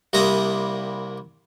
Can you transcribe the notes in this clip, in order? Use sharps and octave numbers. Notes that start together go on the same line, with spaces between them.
C2 C3 G3 A#3 A#5 D#6